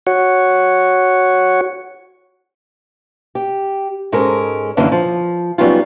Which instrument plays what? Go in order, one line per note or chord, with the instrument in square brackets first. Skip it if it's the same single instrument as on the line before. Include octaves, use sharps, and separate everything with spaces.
[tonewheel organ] F#4 C#5 F#5
[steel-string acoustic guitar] G4
G#2 G#3 C#4 A4 A#4
F#2 D3 E3 A#3
F3
F#3 G3 B3 C#4 D#4 F4